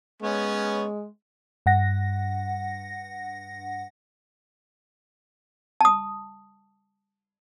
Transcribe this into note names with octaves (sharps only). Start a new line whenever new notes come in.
G#3 B3 C#4 C#5
G2 F#5 A#6
A5 D#6